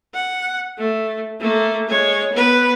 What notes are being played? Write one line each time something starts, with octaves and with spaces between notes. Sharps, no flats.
F#5
A3
A3 A#3
G#3 C#5
B3 B4